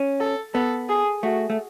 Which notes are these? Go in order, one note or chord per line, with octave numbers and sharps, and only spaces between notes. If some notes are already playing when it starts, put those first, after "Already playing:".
Already playing: C#4
A4
B3 A4
G#4
A3 F#4
A3